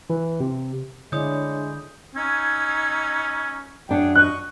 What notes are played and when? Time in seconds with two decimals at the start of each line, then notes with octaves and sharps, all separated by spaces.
0.10 E3
0.40 C3
1.12 D3 G#3 D4 E4 C#5 D5 D#6 G6
2.15 C#4 D#4 E6 G#6
3.89 F#2 D4 G#4 F#5 G5
4.15 D#5 C#6 F#6